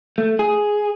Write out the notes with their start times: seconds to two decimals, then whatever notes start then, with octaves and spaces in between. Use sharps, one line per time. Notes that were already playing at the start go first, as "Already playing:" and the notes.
0.18 A3
0.39 G#4